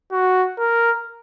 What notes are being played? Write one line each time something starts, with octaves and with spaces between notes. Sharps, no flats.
F#4
A#4